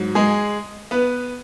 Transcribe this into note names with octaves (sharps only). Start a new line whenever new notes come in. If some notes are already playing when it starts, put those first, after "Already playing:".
Already playing: G#2 F#3
G#3 G#4
B3 B4